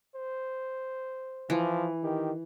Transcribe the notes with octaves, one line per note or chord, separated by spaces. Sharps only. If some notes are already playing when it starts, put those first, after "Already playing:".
C5
E3 F3
D#3 G4